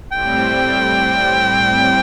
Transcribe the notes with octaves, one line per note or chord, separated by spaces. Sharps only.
A2 G3 C4 G5